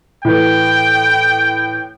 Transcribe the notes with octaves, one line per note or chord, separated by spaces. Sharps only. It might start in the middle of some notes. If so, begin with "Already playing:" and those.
A2 E3 G5